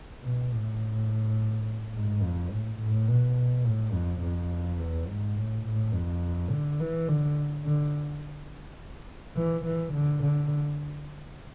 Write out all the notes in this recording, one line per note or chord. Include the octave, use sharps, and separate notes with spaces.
B2
A2
G#2
F2
A2
A2
B2
A2
F2
F2
E2
G#2
A2
A2
F2
D3
E3
D3
D3
E3
E3
D3
D3